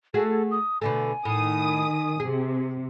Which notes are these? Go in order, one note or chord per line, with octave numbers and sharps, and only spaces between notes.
A3 F#4 G#4 A4
D#6
B2 D3 A3 G#5
A2 D#3 D#6
C3 G#4